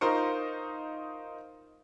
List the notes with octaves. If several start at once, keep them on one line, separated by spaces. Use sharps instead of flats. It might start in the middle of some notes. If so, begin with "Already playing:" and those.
D#4 F4 A#4 C5 C#6